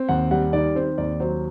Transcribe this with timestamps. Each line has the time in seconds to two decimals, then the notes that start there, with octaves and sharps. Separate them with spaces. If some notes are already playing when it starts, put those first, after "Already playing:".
Already playing: C4
0.09 D#2 F#5
0.31 G3 F#5
0.53 D#3 D5
0.75 C4 C5
0.98 D#2 D5
1.20 F#3 C5